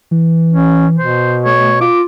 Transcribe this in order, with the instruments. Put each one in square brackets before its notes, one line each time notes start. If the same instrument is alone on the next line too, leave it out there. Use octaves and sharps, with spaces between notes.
[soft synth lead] E3
[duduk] C#4
[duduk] B2 [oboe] C5
[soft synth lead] A3 [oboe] C#5
[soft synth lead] F4 [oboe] D6